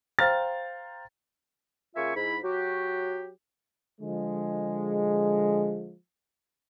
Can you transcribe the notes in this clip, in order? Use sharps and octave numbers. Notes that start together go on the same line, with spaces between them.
C5 F5 G5 A#5 F6 A6
C#3 A#3 F4 E5 G#5 C#6
G#2 E4 B5
F#3 F#4 G4
D3 F3 G#3